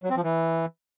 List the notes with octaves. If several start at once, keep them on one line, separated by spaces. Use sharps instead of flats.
F#3
C4
F3
E3